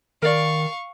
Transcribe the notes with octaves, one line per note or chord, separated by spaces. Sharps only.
D#3 A#4 D5 F5 C#6